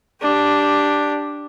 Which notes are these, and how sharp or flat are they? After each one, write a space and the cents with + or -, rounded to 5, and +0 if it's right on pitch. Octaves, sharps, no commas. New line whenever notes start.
D4 +0 G4 +5